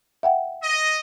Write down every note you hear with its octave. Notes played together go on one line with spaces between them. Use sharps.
E5 F#5 G5
D#5